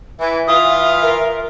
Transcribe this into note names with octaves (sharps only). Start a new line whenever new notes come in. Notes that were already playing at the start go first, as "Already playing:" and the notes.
E3 E5
E3 F4 D#6
A#4